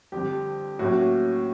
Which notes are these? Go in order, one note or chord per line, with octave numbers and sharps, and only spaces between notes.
F2 D3 G3 G4
A2 F#3 A#3 C#4 F#4